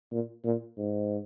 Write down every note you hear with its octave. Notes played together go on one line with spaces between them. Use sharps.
A#2
A#2
G#2